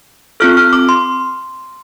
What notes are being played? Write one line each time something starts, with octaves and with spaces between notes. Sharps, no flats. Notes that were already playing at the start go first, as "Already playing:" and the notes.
C4 F4 A4 F6
F6
D6
C6